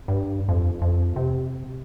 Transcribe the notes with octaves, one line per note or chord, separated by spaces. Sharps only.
G2
F2
F2
C3